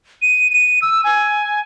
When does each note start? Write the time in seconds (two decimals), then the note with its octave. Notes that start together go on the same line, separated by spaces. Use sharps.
0.22 D#7
0.52 D#7
0.82 E6
1.04 G#5